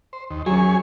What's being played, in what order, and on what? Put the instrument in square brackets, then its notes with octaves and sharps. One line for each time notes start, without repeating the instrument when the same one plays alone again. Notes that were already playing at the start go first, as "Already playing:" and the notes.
[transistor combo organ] C5
D#2
[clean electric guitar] F#3 C#4 [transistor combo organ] G#4 C#5 G#5